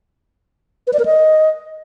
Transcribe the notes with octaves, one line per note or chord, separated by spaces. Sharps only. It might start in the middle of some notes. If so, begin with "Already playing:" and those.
B4
D5
A#4
D#5